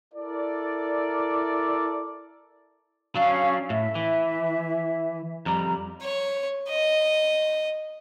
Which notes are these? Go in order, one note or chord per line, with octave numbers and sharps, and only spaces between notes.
E4 A4 A#4 D5
F#3 C#4 D4 F5
A2 E5
E3
F2 G3 A#5
C#5
D#5